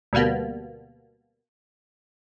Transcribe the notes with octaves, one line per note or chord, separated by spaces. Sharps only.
D2 B2 G3 A#3 B3